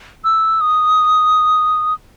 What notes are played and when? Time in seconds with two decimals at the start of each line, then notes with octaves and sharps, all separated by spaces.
0.25 E6
0.61 D#6